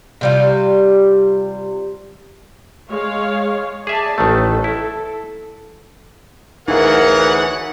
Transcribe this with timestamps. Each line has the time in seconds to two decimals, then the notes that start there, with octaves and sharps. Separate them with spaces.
0.21 C3 G3 F4
2.89 G#3 C#5 F5
3.87 G#4 D5 E5 A5
4.18 A1 D#3 A3 A4
4.64 E4
6.68 D2 E3 D#4 G#4 A#4 C#5 F5 F#5